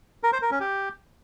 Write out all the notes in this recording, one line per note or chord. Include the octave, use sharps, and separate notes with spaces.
A#4
C5
A#4
C#4
G4